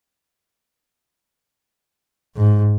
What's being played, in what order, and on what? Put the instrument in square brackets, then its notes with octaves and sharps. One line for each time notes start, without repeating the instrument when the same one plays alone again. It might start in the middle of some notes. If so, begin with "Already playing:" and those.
[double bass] G#2